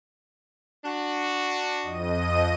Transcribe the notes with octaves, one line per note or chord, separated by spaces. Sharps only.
D4 F#4
F2 D#5 D#7